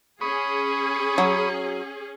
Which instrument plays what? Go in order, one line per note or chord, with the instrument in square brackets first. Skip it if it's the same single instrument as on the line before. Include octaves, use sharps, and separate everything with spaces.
[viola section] C#4 G#4 [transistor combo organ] B5 C#6 D#6
[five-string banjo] F#3